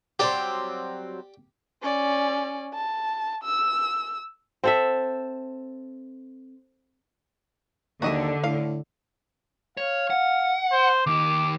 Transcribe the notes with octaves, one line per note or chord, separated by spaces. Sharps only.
F#3 G3 C4 G4 D5
C#4 D5
A5
E6
C4 A4 E5
D#2 D3 F#4 D#5 E5
A2 F5
C#5 F5
F#5
C5
D#2 D#3 D6